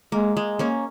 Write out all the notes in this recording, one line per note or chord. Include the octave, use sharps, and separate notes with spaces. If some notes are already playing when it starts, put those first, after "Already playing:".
G#3 A#3
G#3
A#3 C#4